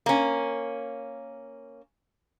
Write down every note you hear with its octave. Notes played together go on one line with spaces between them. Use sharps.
A#3 C#4